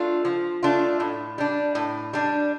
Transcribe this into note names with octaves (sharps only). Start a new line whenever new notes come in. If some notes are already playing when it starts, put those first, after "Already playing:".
Already playing: A3 D4 F4
F3
A3 D4 F4
A2
G3 D4
A2
G3 D4